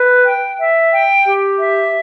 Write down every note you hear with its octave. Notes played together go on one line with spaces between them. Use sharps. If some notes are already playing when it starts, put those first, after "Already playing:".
Already playing: B4
G5
E5
G5
G4
E5